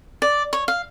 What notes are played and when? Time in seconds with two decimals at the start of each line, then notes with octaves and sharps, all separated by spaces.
0.22 D5
0.53 C#5
0.68 F5